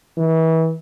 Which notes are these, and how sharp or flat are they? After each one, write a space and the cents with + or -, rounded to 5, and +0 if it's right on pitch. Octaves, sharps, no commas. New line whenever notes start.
E3 -30